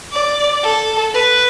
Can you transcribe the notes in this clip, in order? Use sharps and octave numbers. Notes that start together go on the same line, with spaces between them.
D5
A4
B4